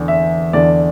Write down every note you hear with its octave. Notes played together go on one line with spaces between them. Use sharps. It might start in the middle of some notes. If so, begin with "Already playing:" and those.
Already playing: E2 D3
E5
E2 D3 D5